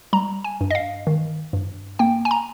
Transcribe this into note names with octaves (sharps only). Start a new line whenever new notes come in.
G3 A#5
G#5
G2
D#5
F5
D#3
G2
A#3 G5
G#5
A#5